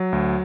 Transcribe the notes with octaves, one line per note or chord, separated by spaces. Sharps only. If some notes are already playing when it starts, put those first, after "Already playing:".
Already playing: F#3
D2